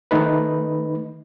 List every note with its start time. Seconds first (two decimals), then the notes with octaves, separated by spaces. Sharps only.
0.11 D#3 A3 D#4 B4